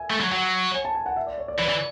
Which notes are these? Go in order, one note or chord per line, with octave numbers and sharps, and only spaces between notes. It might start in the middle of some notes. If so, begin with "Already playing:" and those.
Already playing: E5 G#5
A3
F#3
F#3 F#5
G#5
A5
G#5
F#5
E5
D5
C#5
D5
E3 D5
E3